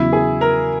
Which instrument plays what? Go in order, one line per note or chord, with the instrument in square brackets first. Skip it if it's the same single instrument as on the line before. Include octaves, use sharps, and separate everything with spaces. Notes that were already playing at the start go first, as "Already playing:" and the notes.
Already playing: [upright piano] E2 C#3 F#3 [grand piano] E4
[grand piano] G#4
A#4